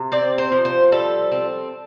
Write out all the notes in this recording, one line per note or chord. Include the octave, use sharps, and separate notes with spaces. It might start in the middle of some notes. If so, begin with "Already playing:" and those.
Already playing: C3
C4 D5
C5
F3
C5
G3 A4
C4